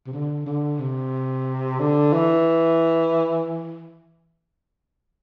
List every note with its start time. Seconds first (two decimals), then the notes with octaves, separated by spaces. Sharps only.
0.06 C3
0.13 D3
0.46 D3
0.79 C3
1.80 D3
2.13 E3